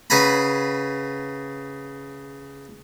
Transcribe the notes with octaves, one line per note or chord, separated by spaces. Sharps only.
C#3 B4 F#5 G#5 A#5 B5